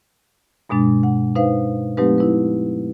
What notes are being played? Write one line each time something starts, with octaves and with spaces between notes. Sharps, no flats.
G2 B2 G#3 D4 A6
F#5
D#4 B4 C5 F5
F#3 A3 C4 D#4 G4 B4
D#4 E4 B4